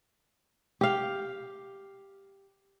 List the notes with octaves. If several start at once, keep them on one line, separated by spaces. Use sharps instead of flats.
G4 F5